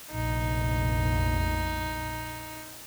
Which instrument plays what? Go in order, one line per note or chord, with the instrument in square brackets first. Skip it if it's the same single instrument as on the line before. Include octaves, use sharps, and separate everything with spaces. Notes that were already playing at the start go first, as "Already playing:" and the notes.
[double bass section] F1 A#1 [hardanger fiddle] D#4